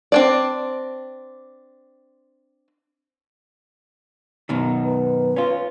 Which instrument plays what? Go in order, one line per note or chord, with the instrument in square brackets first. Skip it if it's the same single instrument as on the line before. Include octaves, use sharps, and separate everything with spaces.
[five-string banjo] C4 D4 D5
[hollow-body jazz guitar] F#2 B2 D#3
[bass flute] B4
[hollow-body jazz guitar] C#4 F4